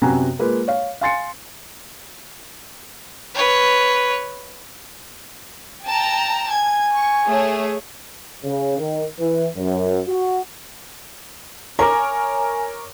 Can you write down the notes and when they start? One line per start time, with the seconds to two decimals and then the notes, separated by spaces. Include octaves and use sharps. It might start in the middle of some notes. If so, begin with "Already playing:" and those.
0.02 F#2 C3 B3 F#4 G#5 A#5
0.39 G#3 A#3 F4 B4
0.68 C#5 F5
1.01 F5 G#5 C6 A6 C7 C#7
3.35 B4 C#5
5.84 G5 A5 A#5
6.50 G#5 G#6
6.94 C#6
7.25 A3 G#4 C#5
8.44 C#3
8.78 D#3
9.18 E3
9.57 F#2
10.07 F#4
11.79 A#4 C#5 G#5 A#5 D6